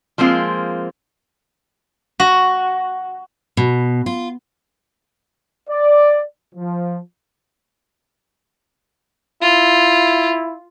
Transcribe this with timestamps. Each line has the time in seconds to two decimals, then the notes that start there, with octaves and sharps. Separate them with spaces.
0.18 F3 G#3 A#3 C4 F4
2.20 F#4
3.57 B2
4.06 F4
5.70 D5
6.55 F3
9.42 E4 F4